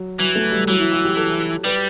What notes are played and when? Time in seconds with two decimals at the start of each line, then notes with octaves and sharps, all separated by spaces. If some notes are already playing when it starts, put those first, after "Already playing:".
Already playing: F#3
0.19 E3 F#3
0.35 A3
0.52 G3
0.67 E3 F#3
0.80 E4
0.92 F#4
1.05 G4
1.16 A4
1.65 G3 B4